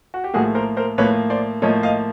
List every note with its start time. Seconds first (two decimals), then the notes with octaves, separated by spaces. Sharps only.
0.14 F#4
0.24 G4
0.34 A2 F3 A#3 F#4 G#4
0.55 A#4 C5
0.77 A#4 C5
0.98 A2 F3 A#3 B4 C#5
1.30 C5 D5
1.62 A2 F3 A#3 C#5 D#5
1.83 D#5 F5